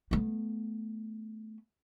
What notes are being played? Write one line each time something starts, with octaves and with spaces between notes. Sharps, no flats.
A3 B3